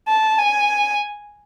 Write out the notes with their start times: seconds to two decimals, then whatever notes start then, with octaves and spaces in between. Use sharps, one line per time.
0.08 A5
0.39 G#5